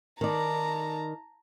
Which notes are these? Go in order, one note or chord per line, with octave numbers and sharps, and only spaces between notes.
D#3 D5 A5 A#5